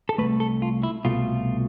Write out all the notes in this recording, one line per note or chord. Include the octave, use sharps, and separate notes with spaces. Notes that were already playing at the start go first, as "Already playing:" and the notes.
A4
C2 B2 A3 B4
A4
F4
E4
C2 B2 A3 F4